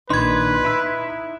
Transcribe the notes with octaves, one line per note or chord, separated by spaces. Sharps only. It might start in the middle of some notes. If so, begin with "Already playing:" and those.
A#1 D#3 D4 D#4 B4 C6 G#6
D#4 E4 E6